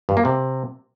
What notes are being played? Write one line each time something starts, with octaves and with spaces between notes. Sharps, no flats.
G2
A#3
C3